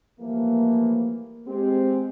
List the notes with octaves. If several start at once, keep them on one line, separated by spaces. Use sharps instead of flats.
E3 F3 G3 A3 A#3
G#3 C4 G4